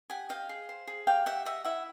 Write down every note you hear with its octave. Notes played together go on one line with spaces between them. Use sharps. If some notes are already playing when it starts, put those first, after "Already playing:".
G4 F#5 G#5
D#5 F5 G5
G#4
C5
G#4
G4 F5 G5
G4 E5 F#5
D#5 E5 F#5
E4 E5 F#5